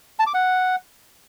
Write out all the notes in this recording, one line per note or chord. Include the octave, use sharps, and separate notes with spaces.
A5
D6
F#5